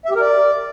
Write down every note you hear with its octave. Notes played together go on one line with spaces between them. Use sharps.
E5
G4
A#4
D5